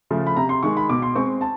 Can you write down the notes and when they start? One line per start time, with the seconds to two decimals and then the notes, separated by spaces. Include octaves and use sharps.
0.10 C#3 F3 A3
0.26 B5
0.36 C3 A#5
0.49 C6
0.63 D#3 G#3 C#6
0.77 B5
0.90 B2 D6
1.02 C6
1.15 G#3 C4 C#6
1.41 A5